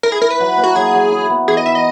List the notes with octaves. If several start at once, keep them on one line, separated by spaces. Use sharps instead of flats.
E4 A#4
G#4
E4 A#4
B4
F#3
A#3
F#4
F#3 G#4
F#3
E4
B3
E3 G#4
D#5
D#4 E5
D#5